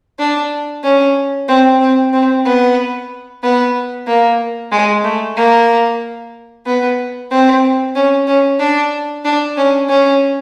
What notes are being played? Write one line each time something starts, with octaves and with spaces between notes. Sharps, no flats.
D4
C#4
C4
C4
C4
B3
B3
A#3
G#3
A3
A#3
B3
C4
C#4
C#4
D4
D4
C#4
C#4